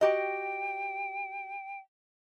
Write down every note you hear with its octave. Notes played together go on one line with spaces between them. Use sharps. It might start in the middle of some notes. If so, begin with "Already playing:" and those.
F#4 G4 D#5 G5